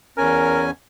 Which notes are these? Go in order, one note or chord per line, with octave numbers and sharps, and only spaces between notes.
E2 C#4 A#4 G#5